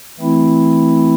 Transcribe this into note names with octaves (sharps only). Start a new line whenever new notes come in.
E3 A3 C4 E4